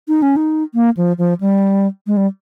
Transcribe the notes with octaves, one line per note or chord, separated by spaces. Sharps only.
D#4
C#4
D#4
A#3
F3
F3
G3
G#3
G3